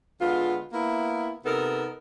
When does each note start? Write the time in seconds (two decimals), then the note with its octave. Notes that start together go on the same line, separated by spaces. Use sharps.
0.21 D3 G#3 B3 F4
0.73 A#3 B3 E4
1.45 C3 B3 D#4 A4 A#4